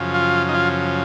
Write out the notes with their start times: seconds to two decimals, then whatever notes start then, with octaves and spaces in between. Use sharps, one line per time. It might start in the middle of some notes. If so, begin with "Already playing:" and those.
Already playing: F#2 C#3 F3
0.14 F4
0.49 D#4
0.54 F4